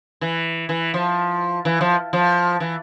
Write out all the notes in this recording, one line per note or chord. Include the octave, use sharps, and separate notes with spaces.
E3
E3
F3
E3
F3
F3
E3